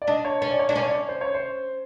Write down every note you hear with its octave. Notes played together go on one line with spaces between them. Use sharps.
D5
D4 D#5
C#5
C#4 C#5
D5
C#5
D4 D5
C#4 C#5
D5
C#5
C5
C#5
C5